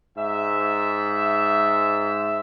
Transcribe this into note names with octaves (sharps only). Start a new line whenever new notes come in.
G#2 E5